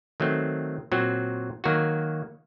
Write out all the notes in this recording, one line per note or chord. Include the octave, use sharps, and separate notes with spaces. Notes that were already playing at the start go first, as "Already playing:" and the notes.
D#3 F#3 A3 C4
A#2 F#3 C4 F#4
D#3 F#3 A#3 F#4